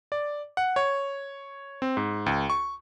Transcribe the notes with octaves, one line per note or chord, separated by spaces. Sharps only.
D5
F#5
C#5
C4
G#2
C#2
C#6